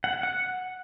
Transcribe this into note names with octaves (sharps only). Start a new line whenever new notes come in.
F#5
F#5